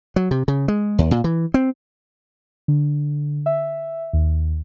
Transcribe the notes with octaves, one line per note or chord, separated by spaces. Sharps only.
F#3
C3
C#3
G#3
D#2
A#2
E3
C4
D3
E5
D#2